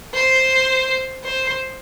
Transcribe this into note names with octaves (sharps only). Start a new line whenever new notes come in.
C5
C5